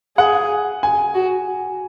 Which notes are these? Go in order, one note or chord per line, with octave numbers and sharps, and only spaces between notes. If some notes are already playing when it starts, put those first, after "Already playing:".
G#4 F#5
G#5
F#4